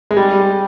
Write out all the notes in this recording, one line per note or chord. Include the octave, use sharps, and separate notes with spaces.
G#3
G3